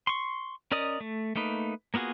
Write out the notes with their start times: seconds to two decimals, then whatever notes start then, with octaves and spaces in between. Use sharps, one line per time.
0.07 C6 C#6
0.72 C#4 A#4 D5 D#5 D#6
1.01 A3
1.36 A3 A#3 D#4 B4
1.94 A#3 B3 F4 F#4 G#4